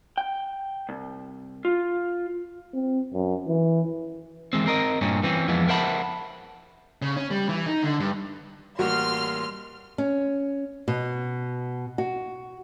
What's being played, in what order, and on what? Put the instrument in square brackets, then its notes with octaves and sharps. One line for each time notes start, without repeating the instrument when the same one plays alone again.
[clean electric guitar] G5
C2
F4
[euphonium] C4
F#2
E3
[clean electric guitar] E3 G#3 C4
C4 A#4 D#5
G2 A#2 C#4
E3 C4 C#4
F2 E3 F3 G#3 B3
A#4 C5 E5 F#5 A5 B5
[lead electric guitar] C#3
C#4
G3
E3
D#4
D3
G2
[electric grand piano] A1 G3 A#3 [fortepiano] F#4 [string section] C6 F6
[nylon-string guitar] C#4
B2
F#4